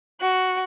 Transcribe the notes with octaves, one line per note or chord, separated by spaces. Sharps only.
F#4